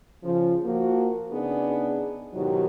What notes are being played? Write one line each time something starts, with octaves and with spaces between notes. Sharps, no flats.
C#3 F3
F3 A#3 F#4
C#3 B3 D4 D#4 G#4
G#2 B2 D#3 F#3 E4 G4